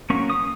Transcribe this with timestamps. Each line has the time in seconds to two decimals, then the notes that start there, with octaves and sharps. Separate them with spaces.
0.10 F#3 A#3 C#4 C#6
0.30 D#6